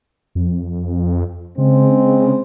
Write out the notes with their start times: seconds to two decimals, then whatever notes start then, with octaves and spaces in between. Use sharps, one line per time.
0.35 F2
1.58 C#3 G#3 C4